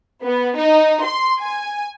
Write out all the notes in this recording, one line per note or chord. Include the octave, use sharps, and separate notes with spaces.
B3
D#4
C6
G#5